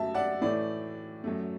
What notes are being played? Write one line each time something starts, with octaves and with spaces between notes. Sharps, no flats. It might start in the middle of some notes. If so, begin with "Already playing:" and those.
Already playing: F#2 F#3 A3 E5 A5
D5 F#5
A2 E3 A3 D5
F#2 F#3 A3